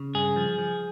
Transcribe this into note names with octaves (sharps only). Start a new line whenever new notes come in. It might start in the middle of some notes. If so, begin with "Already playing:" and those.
Already playing: C#3
G2 G#4
F3
F3